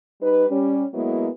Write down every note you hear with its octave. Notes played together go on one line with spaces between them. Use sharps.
G3 D#4 B4
G3 C#4
F#3 G#3 A#3 B3 E4